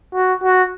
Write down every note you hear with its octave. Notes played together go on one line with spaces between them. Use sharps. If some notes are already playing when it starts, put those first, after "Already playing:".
F#4
F#4